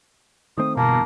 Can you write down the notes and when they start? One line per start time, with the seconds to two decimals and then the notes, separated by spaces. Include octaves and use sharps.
0.58 D#3 A3 C4 D#6
0.77 G1 E2 B2 A#3 A5